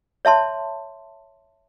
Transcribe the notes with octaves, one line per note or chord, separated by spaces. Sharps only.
C#5 E5 A5 C6